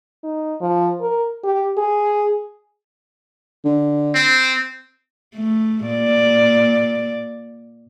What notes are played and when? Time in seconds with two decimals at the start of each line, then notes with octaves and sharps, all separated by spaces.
0.24 D#4
0.61 F3
1.01 A#4
1.44 G4
1.78 G#4
3.65 D3
4.15 C4
5.36 A3
5.86 A#2 D5